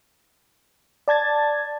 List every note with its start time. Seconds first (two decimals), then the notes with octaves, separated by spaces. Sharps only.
1.08 D5 A5 G#6 A6